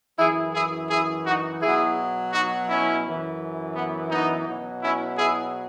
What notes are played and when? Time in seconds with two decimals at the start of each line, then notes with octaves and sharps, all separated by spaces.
0.19 F#2 E3 E4 G#4
0.55 E4 G#4
0.90 E4 G#4
1.26 D#4 F#4
1.62 B2 F#3 E4 G#4
2.33 D#4 F#4
2.69 C#4 E4
3.04 F#2 E3
3.76 B3
4.11 B3 D#4
4.47 B2 F#3
4.83 C#4 E4
5.18 E4 G#4